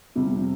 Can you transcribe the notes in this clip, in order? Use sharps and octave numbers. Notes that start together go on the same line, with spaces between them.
F2 C3 G3